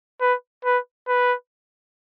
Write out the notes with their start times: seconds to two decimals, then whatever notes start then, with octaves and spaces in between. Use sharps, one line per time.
0.21 B4
0.65 B4
1.08 B4